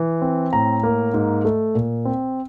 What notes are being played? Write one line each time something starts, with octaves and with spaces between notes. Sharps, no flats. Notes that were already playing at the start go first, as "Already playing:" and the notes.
Already playing: E3
C4
A2 A#5
A#3
G#2
A3
A#2
C4